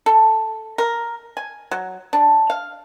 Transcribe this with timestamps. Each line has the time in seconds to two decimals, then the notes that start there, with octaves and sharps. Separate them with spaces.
0.06 A4
0.78 A#4
1.37 G#5
1.71 F#3
2.13 D4
2.50 F5